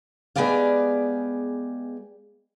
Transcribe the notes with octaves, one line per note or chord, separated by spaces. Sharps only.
G#3 B3 G4 G#4 D5 F5